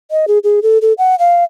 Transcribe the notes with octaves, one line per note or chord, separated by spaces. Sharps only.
D#5
G#4
G#4
A4
A4
F#5
F5